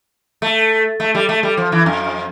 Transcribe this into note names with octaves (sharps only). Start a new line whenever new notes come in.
A3
A3
G3
A3
G3
F3
E3
F2